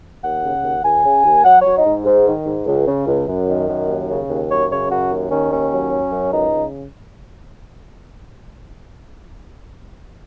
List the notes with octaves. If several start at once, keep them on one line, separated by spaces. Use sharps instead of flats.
D#2 F#5
C#3
D#2
D#2 G#5
C#3
D#2
F#3 F#5
C#5
F#3
D#4
G#2
G#2
D#3
G#2
C#2
C#3
C#2
F#2
D#3
F#2
D#2
C#3
D#2
F#2 C#5
C#3 C#5
F#2 F#4
D#2
D#3 C#4
D#2 C#4
F#3
F#3
F#2
C#2 D#4
C#3